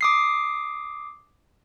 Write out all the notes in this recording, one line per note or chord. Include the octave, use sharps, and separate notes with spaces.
D6 D#6 C7